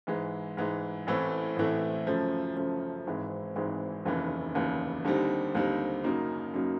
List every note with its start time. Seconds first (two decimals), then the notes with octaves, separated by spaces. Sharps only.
0.07 G#2 E3 G#3
0.57 G#2 E3 G#3
1.07 A1 A2 E3 A3 C4
1.57 A1 A2 E3 A3 C4
2.07 F#2 C#3 F3 A3
2.57 F#2 C#3 F3 A3
3.07 G#1 G#2 E3 G#3 C4
3.55 G#1 G#2 E3 G#3 C4
4.05 F1 D#2 C#3 E3
4.55 F1 D#2 C#3 E3
5.05 D#2 D3 G3 C4 D#4
5.55 D#2 D3 G3 C4 D#4
6.04 F#2 C#3 F#3 A#3 D#4
6.54 F#2 C#3 F#3 A#3 D#4